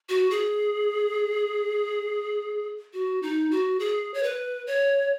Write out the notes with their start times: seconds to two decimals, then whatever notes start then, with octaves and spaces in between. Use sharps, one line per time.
0.09 F#4
0.31 G#4
2.93 F#4
3.22 D#4
3.51 F#4
3.80 G#4
4.14 C#5
4.23 B4
4.67 C#5